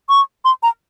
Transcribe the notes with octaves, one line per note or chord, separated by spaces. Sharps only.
C#6
C6
A#5